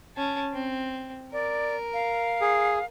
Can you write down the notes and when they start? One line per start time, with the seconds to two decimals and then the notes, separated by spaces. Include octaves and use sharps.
0.16 C#4 A5
0.53 C4
1.33 A#4 D5
1.94 F5
2.41 G#4